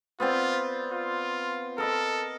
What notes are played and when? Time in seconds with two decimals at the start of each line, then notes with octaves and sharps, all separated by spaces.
0.20 B3 C4 F4 D5
0.92 F4
1.78 A4 A#4 D#5 B5